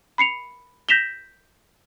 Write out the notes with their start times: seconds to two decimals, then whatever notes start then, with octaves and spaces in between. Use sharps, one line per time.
0.18 B5 C7 C#7 F7
0.89 G6 A#6 B6 E7 F7 G7